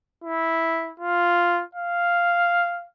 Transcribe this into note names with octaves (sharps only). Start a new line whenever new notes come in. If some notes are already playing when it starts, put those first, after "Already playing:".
E4
F4
F5